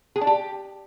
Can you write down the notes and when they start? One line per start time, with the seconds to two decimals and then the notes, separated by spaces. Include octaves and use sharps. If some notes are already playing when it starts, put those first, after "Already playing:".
0.16 G#4
0.21 D4
0.27 G4